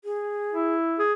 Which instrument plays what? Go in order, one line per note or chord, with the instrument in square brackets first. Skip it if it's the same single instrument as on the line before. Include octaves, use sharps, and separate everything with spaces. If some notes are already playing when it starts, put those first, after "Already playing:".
[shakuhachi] G#4
[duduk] E4
[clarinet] G#4